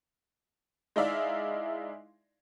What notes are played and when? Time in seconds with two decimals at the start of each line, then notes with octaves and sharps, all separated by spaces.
0.96 G#3 D#4 E4 D5 E5 F5